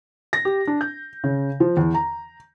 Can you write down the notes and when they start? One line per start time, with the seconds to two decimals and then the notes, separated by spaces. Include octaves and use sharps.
0.33 A#6
0.45 G4
0.67 D4
0.81 G6
1.24 C#3
1.60 F3
1.77 E2
1.94 A#5